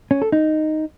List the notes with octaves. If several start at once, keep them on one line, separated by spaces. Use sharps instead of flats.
C#4
A4
D#4